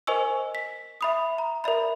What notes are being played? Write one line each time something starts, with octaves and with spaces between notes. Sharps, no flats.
A#4 C5 D#5 G#5 C#6 E6
B6
E5 B5 D#6
A#5
A#4 D5 E5 B5